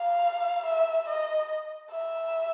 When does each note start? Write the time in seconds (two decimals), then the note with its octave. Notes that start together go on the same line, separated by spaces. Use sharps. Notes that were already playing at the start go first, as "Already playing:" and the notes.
Already playing: F5
0.66 E5
1.08 D#5
1.91 E5